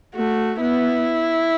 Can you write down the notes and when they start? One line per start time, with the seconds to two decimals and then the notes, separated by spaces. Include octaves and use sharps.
0.15 A3 F#4
0.60 B3 E4